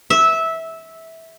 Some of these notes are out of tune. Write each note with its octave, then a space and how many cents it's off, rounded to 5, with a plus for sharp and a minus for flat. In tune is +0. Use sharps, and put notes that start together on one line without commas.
E5 -15